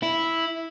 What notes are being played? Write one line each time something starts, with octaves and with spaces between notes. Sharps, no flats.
E4